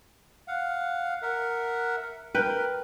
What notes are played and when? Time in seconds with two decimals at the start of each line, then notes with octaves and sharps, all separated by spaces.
0.48 F5 F#5
1.22 A#4 E5 F#5
2.35 A#4 B4 G5